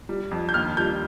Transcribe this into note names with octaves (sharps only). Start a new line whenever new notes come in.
G3
F2
G6
D#2 F6
G3 G6